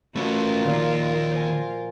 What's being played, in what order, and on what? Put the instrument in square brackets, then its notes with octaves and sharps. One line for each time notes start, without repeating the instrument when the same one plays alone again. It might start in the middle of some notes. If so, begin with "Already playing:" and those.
[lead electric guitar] A3 C#4 [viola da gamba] F4 A#4 [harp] F#4
[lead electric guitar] D#2 D#3 [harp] A#2 F3
[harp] C5 G#5